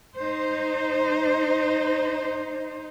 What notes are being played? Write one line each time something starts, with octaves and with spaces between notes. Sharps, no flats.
D#4 C5